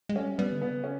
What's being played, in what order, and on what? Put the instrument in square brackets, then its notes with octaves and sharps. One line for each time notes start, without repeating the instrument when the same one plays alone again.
[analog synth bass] G#3
[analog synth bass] G3 [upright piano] C#4
[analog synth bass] G3 [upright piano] B3
[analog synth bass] D3
[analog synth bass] C#3 [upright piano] B3
[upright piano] C#4